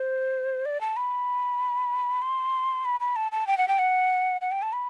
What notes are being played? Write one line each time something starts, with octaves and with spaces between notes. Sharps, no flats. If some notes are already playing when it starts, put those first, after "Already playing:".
Already playing: C5
D5
A5
B5
C6
B5
B5
A5
A5
G5
F#5
G5
F#5
F#5
G5
A5
B5